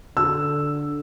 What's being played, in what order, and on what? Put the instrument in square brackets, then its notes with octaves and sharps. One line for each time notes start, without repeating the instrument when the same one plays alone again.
[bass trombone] D3 [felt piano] E6